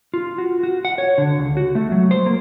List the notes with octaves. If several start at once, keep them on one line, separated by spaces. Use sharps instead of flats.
F4
F#4
F#4
F#5
C#5
D3
C#2
F#4
A3
F#3
C5
A#3